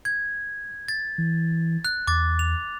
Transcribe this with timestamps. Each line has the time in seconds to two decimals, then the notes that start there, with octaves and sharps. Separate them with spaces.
0.05 G#6
0.88 A6
1.18 E3
1.85 F#6
2.07 E2 D6 A6
2.39 F7